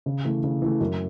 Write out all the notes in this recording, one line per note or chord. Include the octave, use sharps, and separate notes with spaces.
C#3
E3 A3
C#3
E3 A3
F#2